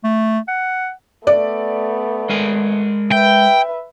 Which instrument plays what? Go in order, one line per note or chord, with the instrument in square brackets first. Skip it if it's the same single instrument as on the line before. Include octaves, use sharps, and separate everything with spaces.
[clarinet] A3
F#5
[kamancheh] A3 B3 [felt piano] D5
[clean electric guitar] G#3 A#4 G#5
[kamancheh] B4 E5 [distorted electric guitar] G5